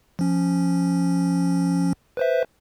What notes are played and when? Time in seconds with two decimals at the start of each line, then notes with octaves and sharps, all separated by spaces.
0.19 F3 C#4
2.17 B4 C5 E5